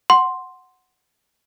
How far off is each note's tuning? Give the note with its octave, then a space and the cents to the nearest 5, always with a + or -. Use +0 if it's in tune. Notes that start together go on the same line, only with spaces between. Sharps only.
F#5 +0 C6 +0